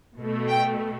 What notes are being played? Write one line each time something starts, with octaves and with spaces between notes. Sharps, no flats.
B2 A3
G5